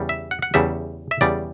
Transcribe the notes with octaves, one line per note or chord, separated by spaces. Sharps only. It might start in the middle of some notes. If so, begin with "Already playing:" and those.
Already playing: E2 C#3 G3
E5
F#5
F#5
E2 C#3 G3 E5
E5
E2 C#3 G3 D5